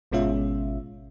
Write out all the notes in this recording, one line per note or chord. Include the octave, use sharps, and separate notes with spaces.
G#1 B2 G#3 C#4 F4 E5